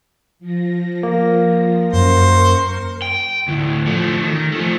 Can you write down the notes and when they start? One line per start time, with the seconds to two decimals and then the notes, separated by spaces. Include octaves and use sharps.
0.39 F3 A#6
1.03 A#3
1.93 F#2 A#4 C5 C#6
3.02 G5
3.48 D2 A2
3.86 F3 A3
4.23 D#3
4.52 F3 A3